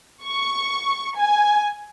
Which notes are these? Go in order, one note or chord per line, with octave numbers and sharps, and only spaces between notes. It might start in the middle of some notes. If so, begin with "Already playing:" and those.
C#6
G#5